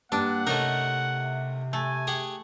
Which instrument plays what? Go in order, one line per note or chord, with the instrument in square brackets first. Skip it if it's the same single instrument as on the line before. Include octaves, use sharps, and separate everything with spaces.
[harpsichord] G2 [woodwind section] A#3 [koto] D4 [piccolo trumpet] F#5
[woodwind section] C3 [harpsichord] A3 C#4 A#4 [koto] D#4
[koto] A3 [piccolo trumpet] G#5
[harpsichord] G4 G#4 F#5